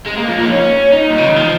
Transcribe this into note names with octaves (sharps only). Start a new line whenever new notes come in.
G#3
A#3
F3
A#3
D#4
C#4
D#4
A#2
C#3
D#3
F3